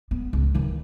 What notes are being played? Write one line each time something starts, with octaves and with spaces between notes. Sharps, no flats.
B3
C#2
D#3 E3